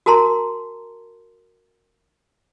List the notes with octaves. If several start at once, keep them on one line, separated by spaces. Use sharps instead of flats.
F#4 A#4 A5 A#5 C6